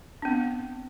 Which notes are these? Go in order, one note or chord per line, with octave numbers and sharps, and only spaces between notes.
B3 C4 D4